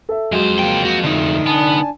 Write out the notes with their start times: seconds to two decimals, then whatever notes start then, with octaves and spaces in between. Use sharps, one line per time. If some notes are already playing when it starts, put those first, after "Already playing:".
0.09 A4 E5
0.32 F2 F#3 G#3 C5
0.59 C#2 A#3 G5
0.85 F#4
1.04 D3 A3 D#4
1.46 B3 D4 G#5 A5